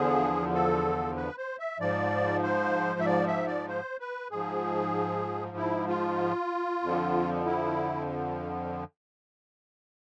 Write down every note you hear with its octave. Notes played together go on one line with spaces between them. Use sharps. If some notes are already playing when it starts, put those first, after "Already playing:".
Already playing: E2 D3 F3 G#4
A4
B4
C5
E5
G#2 F3 D5
C5
E5
D5
E5
D5
C5
B4
G#2 F3 G#4
E4
F4
F2 D3 F3
E4